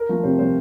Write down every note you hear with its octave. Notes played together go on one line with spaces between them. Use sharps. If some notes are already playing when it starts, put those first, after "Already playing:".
Already playing: A#4
F3 A3
C3 C5
F3 A3 C5